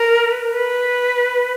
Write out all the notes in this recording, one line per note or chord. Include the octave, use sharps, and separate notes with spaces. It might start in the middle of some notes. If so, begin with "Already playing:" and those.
Already playing: A#4
B4
A#4
B4